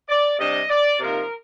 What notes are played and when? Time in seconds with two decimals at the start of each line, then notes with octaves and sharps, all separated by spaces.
0.09 D5
0.39 C3 G3 D4 D#5
0.70 D5
1.00 C3 F3 A#3 D#4 A#4